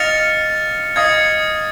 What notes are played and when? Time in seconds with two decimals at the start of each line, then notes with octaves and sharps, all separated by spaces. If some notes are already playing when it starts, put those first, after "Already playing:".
Already playing: D#5 F5 F6 A6 C#7 F7
0.96 D#5 F5 D#6 G#6 C#7